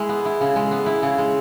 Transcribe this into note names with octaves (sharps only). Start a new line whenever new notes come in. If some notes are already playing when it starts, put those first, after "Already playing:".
Already playing: G#3 E4
B3
E4
C#3
G#3
B3
E4
C#3
G#3